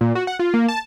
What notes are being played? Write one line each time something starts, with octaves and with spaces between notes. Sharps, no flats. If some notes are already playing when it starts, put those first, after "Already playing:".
A#2
F#4
F#5
F4
A#3
A5